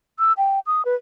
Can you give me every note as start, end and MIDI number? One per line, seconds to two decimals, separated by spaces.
0.19 0.33 88
0.37 0.59 79
0.66 0.84 87
0.85 0.95 71